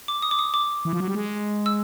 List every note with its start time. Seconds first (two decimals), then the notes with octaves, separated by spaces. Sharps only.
0.08 D6
0.22 D#6
0.31 D6
0.39 D#6
0.54 D6
0.85 E3
0.93 F3
1.00 F#3
1.08 G3
1.15 G#3
1.66 E6